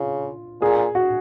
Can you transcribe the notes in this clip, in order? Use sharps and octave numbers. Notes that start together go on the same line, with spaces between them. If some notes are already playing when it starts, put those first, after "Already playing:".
Already playing: C#3 F4
A#2 G#4
F#4